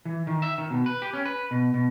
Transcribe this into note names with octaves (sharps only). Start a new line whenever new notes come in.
E3
D#3
E5
D#3
B2
B4
G4
C#4
B4
B2
B2